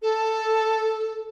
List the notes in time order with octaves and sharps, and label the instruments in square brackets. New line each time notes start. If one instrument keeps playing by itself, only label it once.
[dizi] A4